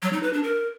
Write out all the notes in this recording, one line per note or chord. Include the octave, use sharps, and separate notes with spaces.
F#3
D#4
B4
D4
A#4